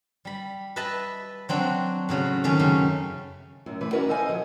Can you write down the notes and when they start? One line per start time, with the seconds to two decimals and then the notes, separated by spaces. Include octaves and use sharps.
0.25 G3 B5
0.76 B4 D#5 E5 A5 B5
1.49 F#3 C4 D4 F#4
2.09 A2 C#3 F#3
2.44 C3 D#3 A3 C#4
2.59 F#2 C#3
3.66 F#2 A2
3.81 E3 A3 B4
3.93 C#4 E4 F#4 A#4 B4 D5
4.09 A4 C5 D#5 F5 G#5
4.29 F3 F#3